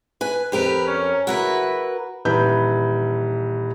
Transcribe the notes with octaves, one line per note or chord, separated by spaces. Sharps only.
B4 G#5
F2 G4 A#4 B4
C#4
C#3 F#3 E4 F#4 A#4 B4
D#1 E3 B4 G6